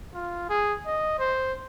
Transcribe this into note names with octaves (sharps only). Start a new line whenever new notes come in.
F4
G#4
D#5
C5